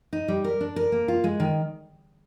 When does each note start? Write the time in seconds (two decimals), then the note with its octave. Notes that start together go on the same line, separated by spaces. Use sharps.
0.13 D#4
0.28 G3
0.44 A#4
0.61 D4
0.76 A#4
0.92 A#3
1.08 F4
1.24 G#3
1.40 D#3